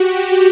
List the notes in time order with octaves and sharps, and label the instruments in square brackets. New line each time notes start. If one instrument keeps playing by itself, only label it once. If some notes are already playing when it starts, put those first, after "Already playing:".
Already playing: [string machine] F#4 G4